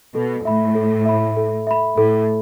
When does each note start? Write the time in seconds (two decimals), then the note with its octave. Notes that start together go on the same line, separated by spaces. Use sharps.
0.14 B2 A4
0.45 A2 E5 B5
0.75 A4
1.05 E5 B5
1.37 A4
1.67 E5 B5
1.97 A2 A4